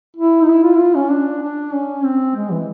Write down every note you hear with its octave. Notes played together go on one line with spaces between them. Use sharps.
E4
D#4
E4
F4
E4
F4
C#4
D4
D4
C#4
C4
G#3
E3